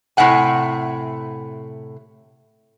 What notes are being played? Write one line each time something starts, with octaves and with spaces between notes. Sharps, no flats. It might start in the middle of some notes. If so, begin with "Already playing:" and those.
A2 C3 E5 F#5 G#5